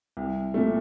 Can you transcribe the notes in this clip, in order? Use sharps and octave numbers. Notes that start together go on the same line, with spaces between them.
C2
A#2 A3